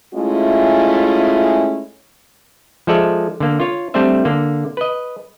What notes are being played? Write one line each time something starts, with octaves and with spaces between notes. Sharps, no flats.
G#3 A3 C#4 E4 F4
F3 G#3 A4 D5 E5
D3 A#3
F4 C#5
G3 A3 C4 D4 C5 E5
D3 A#3
B4 D#5